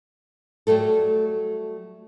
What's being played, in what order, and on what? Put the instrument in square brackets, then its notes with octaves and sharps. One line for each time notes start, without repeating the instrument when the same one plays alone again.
[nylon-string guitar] F#3 G3 A3 A4